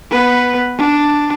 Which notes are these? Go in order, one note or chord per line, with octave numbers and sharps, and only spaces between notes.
B3 B4
D4